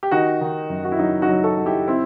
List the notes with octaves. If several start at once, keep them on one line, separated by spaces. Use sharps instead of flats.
G4
D#3 D#4 F#4
D#3
F#2
F#4
E4
F#3 D#4
D#4 F#4
F#3
F#4 A4
F#3
E4 G4
C4 E4